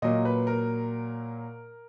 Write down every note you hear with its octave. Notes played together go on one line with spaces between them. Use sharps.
A#2 F#3 A#3 D#5
B4
A#4